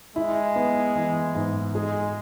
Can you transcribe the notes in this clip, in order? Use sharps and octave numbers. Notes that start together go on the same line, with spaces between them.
G#3 E4
B3
E3
G#2
G#3 G#4